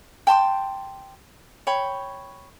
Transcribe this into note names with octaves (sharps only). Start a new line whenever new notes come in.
G5 A5 C6 D6
C#5 G5 B5